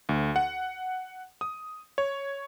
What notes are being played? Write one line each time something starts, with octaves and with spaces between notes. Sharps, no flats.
D2
F#5
D#6
C#5